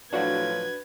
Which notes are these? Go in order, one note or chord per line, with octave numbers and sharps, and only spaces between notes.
A2 F3 F#3 D4 F#4 B4 G#6